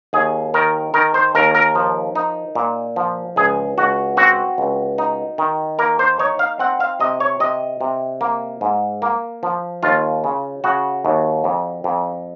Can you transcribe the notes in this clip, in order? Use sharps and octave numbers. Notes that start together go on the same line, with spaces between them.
D#2 G#4
D#3 A#4
D#3 A#4
C5
D#2 A#4
A#4
F3
D#4
A#2
F3
C#2 G#4
C#2 F#4
C4 F#4
C#2
D#4
D#3
A#3 A#4
C5
D#4 C#5
F5
C4 F#5
F5
C3 D#5
C#5
C3 D#5
C3
A#3
G#2
A#3
F3
D#2 F4
C#3
C#3 F#4
D#2
F2
F2